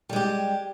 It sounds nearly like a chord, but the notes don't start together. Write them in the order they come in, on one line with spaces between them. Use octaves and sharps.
G3 G#3 G4